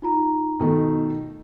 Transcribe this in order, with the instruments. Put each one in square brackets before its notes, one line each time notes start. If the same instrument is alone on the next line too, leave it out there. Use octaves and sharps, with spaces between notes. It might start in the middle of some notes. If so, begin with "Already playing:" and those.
[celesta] D#4 F4 A#5
[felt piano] B2 D#3 A3